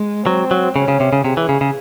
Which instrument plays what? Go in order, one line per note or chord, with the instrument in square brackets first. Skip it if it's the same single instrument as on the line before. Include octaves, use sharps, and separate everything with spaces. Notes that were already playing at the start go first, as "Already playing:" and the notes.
Already playing: [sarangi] G#3
[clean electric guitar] F#3 [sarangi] C4
[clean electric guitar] F#3
[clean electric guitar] C#3 [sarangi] C#4
[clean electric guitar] C#3
C3
C#3
[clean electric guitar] C3 [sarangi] G#4
[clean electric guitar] E3
C#3
C#3